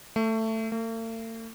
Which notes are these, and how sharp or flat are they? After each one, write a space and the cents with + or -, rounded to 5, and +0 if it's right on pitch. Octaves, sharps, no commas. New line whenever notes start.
A3 +15
A3 +45